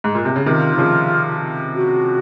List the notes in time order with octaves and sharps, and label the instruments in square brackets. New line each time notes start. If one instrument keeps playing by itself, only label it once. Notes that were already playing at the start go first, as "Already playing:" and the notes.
[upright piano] G#2
A#2
C3
C#3
[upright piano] C3 D#3 [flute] F4
[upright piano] D#3
C#3 F3
[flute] F#4